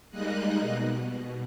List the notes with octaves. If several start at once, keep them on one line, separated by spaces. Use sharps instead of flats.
G3 G#3 A#3 D#4 D#5 F#6
B2